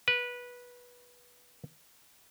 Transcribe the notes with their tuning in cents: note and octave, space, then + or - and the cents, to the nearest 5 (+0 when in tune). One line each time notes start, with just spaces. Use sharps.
B4 -15